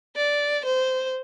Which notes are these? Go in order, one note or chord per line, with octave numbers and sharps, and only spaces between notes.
D5
C5